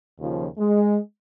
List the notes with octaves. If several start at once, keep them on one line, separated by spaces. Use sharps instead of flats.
D#2 C#3 F3
G#3